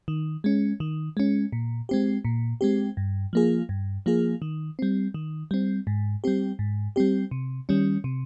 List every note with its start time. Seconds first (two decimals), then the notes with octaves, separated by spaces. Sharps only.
0.08 D#3
0.44 G#3 C#4
0.80 D#3
1.17 G#3 C#4
1.52 A#2
1.89 G#3 C4 G4
2.25 A#2
2.61 G#3 C4 G4
2.97 G2
3.33 F3 A#3 F4 G#4
3.69 G2
4.06 F3 A#3 F4 G#4
4.42 D#3
4.79 G3 C4
5.14 D#3
5.51 G3 C4
5.87 G#2
6.24 G3 C4 G4
6.59 G#2
6.96 G3 C4 G4
7.31 C3
7.69 D#3 G3 C#4
8.04 C3